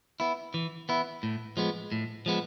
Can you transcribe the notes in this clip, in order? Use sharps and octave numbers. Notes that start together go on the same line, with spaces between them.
B3 E4
E3
B3 E4
A2
F3 G#3 B3
A2
F3 G#3 B3